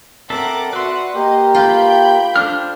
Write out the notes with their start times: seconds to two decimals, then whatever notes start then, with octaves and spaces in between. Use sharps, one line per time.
0.30 C4 A4 A#4 E5 F#5 D6 F#6
0.73 F#4 B4 D5 E5 F#5 C6
1.14 A#3 G4 D#5
1.55 F4 G5 B5 G6
2.36 D4 C5 F6